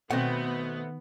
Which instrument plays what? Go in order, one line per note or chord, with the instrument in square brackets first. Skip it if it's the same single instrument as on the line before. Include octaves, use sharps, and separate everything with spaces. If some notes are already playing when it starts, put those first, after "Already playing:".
[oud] B2 [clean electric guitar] D#3 F#5 [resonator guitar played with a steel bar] A3 C4 [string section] B3